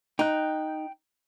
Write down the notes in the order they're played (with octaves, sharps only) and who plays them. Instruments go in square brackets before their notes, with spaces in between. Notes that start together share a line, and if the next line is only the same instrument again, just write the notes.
[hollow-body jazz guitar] D#4 [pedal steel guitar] G5 F#6